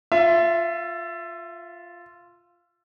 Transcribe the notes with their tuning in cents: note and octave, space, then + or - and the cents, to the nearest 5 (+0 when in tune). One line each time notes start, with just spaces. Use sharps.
F4 +0 E5 +25